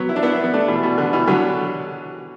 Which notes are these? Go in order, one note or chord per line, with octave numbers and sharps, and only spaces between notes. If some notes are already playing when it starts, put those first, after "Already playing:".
Already playing: F#3 B3
E4
D4
B3 E4
B3
A3 D4
B2 E3
B2
D3
B2 E3
D3 F#3